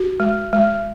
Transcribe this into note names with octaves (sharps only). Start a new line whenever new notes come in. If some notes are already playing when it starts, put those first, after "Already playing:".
Already playing: F#4
G#3
G#3